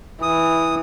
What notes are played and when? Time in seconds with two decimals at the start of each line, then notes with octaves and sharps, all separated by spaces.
0.22 E3 D#6